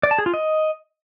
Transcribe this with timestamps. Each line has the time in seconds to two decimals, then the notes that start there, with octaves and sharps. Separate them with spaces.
0.03 D5
0.11 A5
0.18 G#4
0.26 F4
0.34 D#5